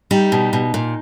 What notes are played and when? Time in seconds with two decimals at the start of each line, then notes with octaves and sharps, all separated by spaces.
0.11 G3 D#4
0.32 B2
0.53 B2
0.74 A#2